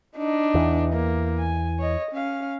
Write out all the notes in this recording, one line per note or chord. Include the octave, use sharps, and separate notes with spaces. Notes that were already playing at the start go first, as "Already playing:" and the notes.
D4 D#4
E2 E3
A#3
G#5
C#5 D#5
C#4 F5